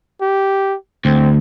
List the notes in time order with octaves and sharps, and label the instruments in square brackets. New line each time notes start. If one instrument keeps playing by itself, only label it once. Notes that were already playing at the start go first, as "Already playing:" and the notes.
[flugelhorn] G4
[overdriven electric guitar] D2 [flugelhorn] C4